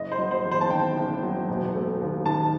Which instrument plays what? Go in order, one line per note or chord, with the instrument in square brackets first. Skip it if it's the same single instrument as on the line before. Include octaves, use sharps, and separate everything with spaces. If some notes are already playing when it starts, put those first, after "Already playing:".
Already playing: [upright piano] F#1 D#5
C5
F#3
C5
E2
C5
A5
D#3 G5
F#1
F#3
E1
A3
D#2
D#3 A5